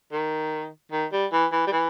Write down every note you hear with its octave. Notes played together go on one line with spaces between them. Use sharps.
D#3
D#3
G3
E3
E3
G3
E3